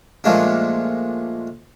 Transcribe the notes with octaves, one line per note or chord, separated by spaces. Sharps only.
A#2 F3 G#3 A3 D4